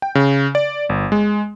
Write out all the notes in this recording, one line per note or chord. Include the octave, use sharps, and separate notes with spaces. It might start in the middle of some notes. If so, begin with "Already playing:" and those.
G5
C#3
D5
G1
G#3